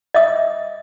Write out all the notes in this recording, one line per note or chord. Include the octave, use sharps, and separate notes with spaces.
D#5 E5 D#6